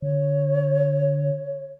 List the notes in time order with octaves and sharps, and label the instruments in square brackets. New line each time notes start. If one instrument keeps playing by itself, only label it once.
[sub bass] D3 [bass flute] C#5